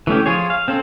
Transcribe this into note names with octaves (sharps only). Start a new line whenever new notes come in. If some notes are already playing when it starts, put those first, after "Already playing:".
E3 A3 C#4 G4
F3 F4 G#4 C#5
F5
C4 C#4 A4 C5